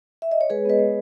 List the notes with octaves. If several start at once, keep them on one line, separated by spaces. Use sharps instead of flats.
E5
D#5
C#5
G#3 G#4 B4
B3 B4 D#5
G#3